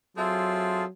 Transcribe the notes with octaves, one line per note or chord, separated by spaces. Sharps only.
F#3 C4 F4 G#4 A4 E5